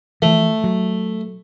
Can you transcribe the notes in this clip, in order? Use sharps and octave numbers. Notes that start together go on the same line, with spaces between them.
E3 F3 A3
F#3